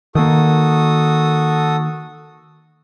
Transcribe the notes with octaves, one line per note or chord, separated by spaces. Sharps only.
D#3 A#3 F#4 A4 D#6